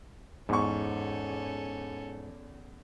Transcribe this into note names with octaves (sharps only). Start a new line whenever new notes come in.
E2 G#2 C#4 A4 C#6